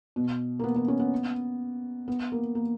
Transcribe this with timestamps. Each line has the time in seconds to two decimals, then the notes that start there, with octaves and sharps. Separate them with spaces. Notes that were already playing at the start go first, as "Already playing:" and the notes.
0.16 B2
0.59 A#3
0.64 B3
0.76 B3
0.88 C#4
0.99 B3
2.08 B3
2.32 A#3
2.55 A#3